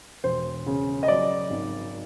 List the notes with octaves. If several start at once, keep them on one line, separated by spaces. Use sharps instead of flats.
E1 C5
C#3
D#5
F#3 D5
G#1